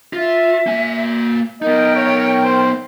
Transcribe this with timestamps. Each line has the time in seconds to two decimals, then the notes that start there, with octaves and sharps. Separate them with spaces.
0.13 F4 E5
0.67 A#3 G#5
1.62 B3 D#4 A#4 D#5 G5
1.96 C#5
2.45 C5